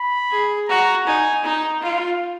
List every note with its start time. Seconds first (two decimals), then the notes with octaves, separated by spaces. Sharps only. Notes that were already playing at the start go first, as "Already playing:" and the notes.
Already playing: B5
0.31 G#4
0.68 F#4 A#5
1.07 D#4 G#5
1.44 D#4
1.82 F4